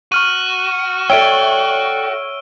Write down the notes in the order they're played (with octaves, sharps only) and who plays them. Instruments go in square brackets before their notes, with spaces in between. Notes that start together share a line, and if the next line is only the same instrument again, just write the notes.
[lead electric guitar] F#4 [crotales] C#6 F6 D#7
[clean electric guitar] A4 D5 G5 [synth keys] C#5 E5 [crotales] E6 D7 G7